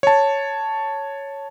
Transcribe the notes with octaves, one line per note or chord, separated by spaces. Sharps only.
C#5 A5